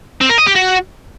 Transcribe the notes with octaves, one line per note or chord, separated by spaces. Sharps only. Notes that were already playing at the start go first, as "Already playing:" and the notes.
C4
A#4
D#5
G4
F#4